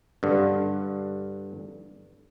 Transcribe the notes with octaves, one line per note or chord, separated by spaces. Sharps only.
G2 D3